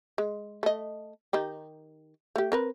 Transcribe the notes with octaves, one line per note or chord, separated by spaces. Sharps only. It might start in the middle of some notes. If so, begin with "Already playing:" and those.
G#3
A3 D#5
D#3 D#4 G4
A3 G4
C4 A#4 B4